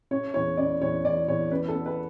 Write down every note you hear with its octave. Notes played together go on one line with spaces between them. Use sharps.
C#3 C#5
E2 C#5
C#3 D5
E2 C#5
E2 D5
E2 C#5
C#3 B4
A4
B3
B4